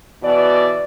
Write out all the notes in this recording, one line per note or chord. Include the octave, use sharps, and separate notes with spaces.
B2 E3 D5